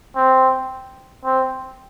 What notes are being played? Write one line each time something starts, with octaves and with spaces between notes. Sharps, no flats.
C4
C4